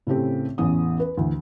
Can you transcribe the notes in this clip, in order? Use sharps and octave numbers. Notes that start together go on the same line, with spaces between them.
A2 C#3 A3 C4 G4
A1 E2 C#4 D#6
B4
D2 E3